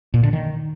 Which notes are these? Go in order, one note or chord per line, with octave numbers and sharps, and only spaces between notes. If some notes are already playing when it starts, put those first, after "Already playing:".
A#2
D3
D#3